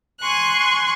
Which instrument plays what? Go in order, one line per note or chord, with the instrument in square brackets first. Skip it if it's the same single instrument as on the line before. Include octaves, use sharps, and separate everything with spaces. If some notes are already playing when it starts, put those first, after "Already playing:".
[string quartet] G#5 C6 C#6 F#6